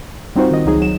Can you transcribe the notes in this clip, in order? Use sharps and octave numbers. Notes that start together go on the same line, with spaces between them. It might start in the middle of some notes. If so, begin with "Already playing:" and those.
G3 C4 D#4 F4 F#4 C5
D#3 D#5
C#2 F#3 D#4 G#4
F#3 E7